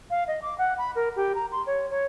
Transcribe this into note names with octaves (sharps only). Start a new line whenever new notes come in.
F5
D#5
D6
F#5
B5
A#4
G4
A#5
C6
C#5
C#5